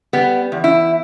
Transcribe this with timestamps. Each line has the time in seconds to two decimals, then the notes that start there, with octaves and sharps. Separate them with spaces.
0.13 G3 B3
0.52 E2
0.64 E4